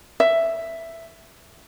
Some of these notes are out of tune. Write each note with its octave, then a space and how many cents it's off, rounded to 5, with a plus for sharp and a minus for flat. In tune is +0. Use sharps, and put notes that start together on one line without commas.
E5 +5